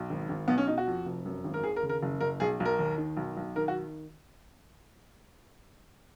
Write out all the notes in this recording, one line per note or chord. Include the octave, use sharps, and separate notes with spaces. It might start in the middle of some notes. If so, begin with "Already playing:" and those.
Already playing: B1
G#1
G#1
B1 B3
C#4
B2 D#4
F#4
F2
F1
F#2
G#1
A#4
D#2 G#4
A#4
C#3
A#4
F#1
F#1 A#4
B1 G#4
B1
A#4
D#2
D#3
B1
B1
D#3 A#4
F#4